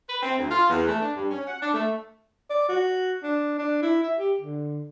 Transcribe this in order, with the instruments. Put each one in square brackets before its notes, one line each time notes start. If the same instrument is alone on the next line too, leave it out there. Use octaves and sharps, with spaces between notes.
[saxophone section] B4
C4
D2
F4
E2
A3
D4
G2
C#4
F#5
D4
A3
[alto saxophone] D5
F#4
D4
D4
E4
E5
G4
D3